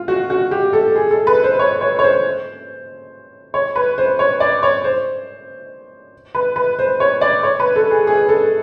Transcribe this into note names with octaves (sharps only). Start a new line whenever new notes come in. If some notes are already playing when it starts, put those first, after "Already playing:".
Already playing: F4
F#4
F#4
G4
A4
G#4
A4
B4
C5
C#5
C#5
C#5
C5
C#5
B4
C5
C#5
D5
C#5
C5
B4
B4
C5
C#5
D5
C#5
B4
A4
G#4
G#4
A4